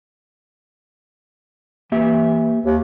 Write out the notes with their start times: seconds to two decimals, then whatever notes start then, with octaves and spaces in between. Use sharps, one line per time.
1.92 E3 A#3 G4 E5
2.66 D#2